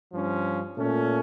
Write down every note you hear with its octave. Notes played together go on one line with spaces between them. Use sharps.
G2 F3 C#4
A#2 A3 C#4